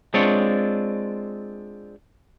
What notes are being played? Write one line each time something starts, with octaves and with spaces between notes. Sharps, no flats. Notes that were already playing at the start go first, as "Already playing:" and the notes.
G#3 C4 D4 F4 C#5